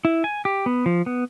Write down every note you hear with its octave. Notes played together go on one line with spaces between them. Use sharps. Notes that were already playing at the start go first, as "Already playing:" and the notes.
E4
G#5
G4
B3
F3
B3